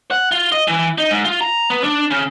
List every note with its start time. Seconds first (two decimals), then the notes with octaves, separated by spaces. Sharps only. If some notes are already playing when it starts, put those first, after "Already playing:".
0.11 F#5
0.32 F4
0.52 D#5
0.68 E3
0.98 D#4
1.10 G#2
1.25 F4
1.41 A#5
1.70 B3
1.84 D4
2.11 C#3